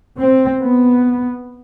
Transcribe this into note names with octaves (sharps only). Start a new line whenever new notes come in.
C4
B3